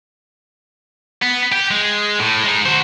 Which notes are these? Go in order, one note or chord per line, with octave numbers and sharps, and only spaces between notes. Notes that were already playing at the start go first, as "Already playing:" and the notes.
B3
G4
G#3
A2
G#3 D#4
F#4 C5